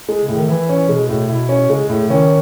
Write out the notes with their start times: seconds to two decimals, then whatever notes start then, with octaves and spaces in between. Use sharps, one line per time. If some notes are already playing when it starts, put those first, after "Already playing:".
0.09 G#3
0.21 C#3
0.28 A2
0.35 D#3
0.48 E3 E4
0.69 C#4
0.89 B2 G#3
1.09 A2
1.29 B2 E4
1.49 C#4
1.69 C#3 G#3
1.89 A2
2.09 D#3 C#4